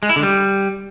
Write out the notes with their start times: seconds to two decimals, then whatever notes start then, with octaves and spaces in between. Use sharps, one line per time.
0.03 G#3
0.09 E4
0.16 D3
0.23 G3